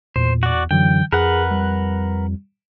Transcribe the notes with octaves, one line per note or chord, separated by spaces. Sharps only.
E2 A#2 C5
F#4 D5
F#2 D3 E3 F#3 G5
F2 G#4 A#4 B4 F#5
G3